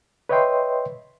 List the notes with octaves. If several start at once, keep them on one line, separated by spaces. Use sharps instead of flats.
B4 C#5 D#5 E5 G5 C6